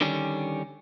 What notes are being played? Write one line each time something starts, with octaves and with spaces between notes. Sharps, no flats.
D3 D#3 G3 C#4